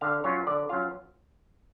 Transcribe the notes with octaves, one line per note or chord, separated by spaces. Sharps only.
D3 F5
F#3 C#4 F4 C#5
D3 D5
F#3 C#4 F4 F5